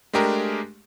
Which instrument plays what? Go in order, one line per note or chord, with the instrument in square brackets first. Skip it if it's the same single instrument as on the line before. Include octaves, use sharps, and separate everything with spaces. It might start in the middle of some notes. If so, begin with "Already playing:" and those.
[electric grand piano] G#3 A3 D4 G4 G#4 A#4